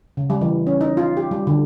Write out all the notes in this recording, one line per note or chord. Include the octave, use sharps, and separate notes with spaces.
C#3
G3
E3
C#4
D#4
F4
G4
G3
D3